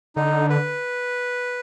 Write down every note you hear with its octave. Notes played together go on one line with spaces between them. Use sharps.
D3 D#4
B4